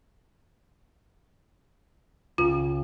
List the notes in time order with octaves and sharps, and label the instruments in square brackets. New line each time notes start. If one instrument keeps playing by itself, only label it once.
[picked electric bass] C#2 C#3 [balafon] F4